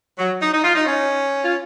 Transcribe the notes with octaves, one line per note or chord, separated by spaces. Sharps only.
F#3
D#4
D#4
F4
D#4
C#4
F4